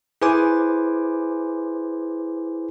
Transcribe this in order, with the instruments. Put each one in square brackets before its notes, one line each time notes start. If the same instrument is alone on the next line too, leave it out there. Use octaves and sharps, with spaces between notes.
[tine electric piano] E4 G#4 B4 C5 G#5 D6